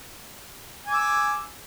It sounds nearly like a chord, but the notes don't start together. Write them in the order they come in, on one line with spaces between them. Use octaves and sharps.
G#5 D6 E6